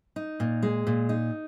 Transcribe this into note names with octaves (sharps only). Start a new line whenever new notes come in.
D#4
A#2
G#3
A#2
D#4